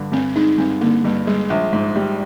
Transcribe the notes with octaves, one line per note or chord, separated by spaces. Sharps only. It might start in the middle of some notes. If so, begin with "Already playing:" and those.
Already playing: G2 D3
G2 C4
G#3 D#4
G2 C4
D3 A#3
G2 G3
G3 G#3
A#1
G#2
G3